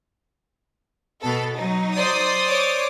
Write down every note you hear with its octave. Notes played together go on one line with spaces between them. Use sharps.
B2 B3 A4
F#3 D#4
C5 D5 D#6
C#5 D6